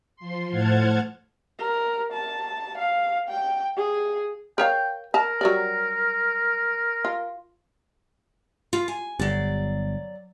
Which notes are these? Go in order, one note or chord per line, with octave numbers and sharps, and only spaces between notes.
F3 C6
A2 C5 F#5 A5 F6 G#6
A#4
A5
F5
G5
G#4
A#4 C#5 F5 G5
A#4 A5 A#5
F#3 G3 D5
F4
F4
G#5
G1 F#3 D5